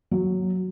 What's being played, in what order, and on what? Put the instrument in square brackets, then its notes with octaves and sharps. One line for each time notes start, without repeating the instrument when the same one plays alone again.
[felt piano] F#3